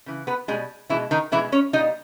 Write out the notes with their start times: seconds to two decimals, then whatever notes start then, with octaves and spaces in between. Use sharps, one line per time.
0.06 C#3 E3
0.27 B3 B4
0.48 B2 G3 G#3 G#4
0.89 B2 E3 G#3 E4
1.11 D#3 D#4
1.32 B2 E3 G#3 E4
1.52 C#4 C#5
1.73 A#2 G3 D#4 D#5